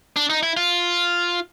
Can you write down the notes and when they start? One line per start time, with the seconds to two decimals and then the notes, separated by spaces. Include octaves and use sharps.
0.16 D4
0.30 D#4
0.43 E4
0.57 F4